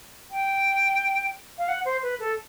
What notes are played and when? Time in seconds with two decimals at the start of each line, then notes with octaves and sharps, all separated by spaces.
0.31 G5
1.58 F5
1.68 F#5
1.85 C5
2.03 B4
2.20 A4